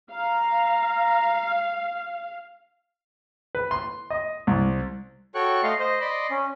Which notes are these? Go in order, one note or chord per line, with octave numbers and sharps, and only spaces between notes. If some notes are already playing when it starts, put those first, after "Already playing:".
F5 A#5
B4
C6
D#5
C2
F#4 A4 C#5 G5 C#6 F#6
A3 D#5 F5 C6
C5 D#5
D5 D#5 B5 C6
C#4